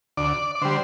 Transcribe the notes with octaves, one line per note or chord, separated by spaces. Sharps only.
D2 D5
D5
D3 G3 C5